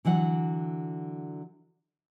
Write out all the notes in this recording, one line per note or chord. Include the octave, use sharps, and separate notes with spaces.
D3 E3 F#3 F#5